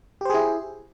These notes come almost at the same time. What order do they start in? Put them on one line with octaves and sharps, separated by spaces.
G4 C5 G#4 E4